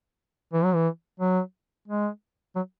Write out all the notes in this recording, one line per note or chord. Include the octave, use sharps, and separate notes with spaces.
E3
F#3
E3
F#3
G#3
F#3